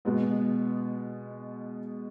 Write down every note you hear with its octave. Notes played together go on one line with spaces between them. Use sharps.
B2 G#3 B3